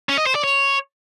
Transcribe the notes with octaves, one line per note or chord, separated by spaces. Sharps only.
C#4
D#5
C5
D5
C#5